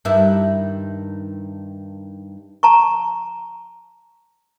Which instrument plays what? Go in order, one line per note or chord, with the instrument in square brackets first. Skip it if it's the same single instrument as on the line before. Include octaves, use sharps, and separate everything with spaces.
[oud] G2 D#3 E4
[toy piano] A5 A#5 C#6